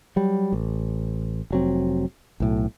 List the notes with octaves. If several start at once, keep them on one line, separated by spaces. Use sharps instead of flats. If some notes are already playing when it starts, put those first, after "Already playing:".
F#3 G3
A1
F1 F#3 C4
B1 A2